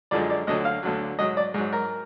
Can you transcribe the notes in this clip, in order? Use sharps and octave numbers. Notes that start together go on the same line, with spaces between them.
F#2 D3 F3 G#3 D5
D5
D2 D3 F#3 D#5
F5
D2 D3 F#3
G#2 F#3 D#5
D5
G#2 F#3
A#4